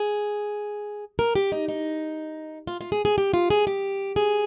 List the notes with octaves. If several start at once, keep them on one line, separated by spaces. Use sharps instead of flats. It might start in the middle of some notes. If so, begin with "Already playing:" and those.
Already playing: G#4
A#4
G4
D#4
D#4
F4
F4
G#4
G#4
G4
F4
G#4
G4
G#4